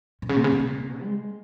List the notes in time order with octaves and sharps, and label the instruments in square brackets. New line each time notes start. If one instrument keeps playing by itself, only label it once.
[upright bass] A#2
C#3
A#2
C#3
A#2
C#3
A#2
G#3